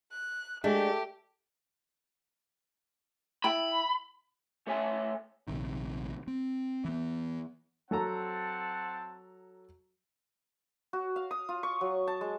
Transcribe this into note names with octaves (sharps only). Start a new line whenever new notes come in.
F#6
G#3 A3 D4 G4
E4 G5 A5 B5
A3 A4 C#5 E5 G#5
A#1 C3 D#3
C4
E3 B3
F#3 C4 A4 F#5 A5 A#5
F#4
F5
D#6
F4
C#6
F#3
A5
G#3